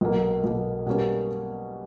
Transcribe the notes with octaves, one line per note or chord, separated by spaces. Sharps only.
B1 B2 A#3
B1 B2 A#3
B2 G3 A#3 C#4